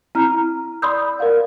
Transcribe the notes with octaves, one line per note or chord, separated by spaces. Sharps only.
C4 E4 A#5 F6
D5 B5 C6 D#6 E6 G6
A#4 D5 F5 F#5